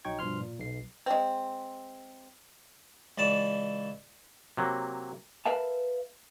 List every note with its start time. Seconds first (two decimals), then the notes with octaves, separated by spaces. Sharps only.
0.05 A#1 F#3 D#4 G5 C#6 G#6
0.19 G2 B2 F3 C6 F6
0.40 A#2
0.59 B1 C7
1.06 G#3 C4
3.18 C#2 E3 D5 A5
4.57 C3 F#3 A#3
5.46 A#4 B4 E5 F5 A5